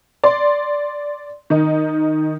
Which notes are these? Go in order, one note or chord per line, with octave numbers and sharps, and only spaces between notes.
D5 C6
D#3 D#4